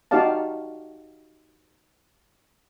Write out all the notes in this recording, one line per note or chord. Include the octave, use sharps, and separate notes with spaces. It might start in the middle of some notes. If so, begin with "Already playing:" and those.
D#4 F#4 G4 D5 F5 A5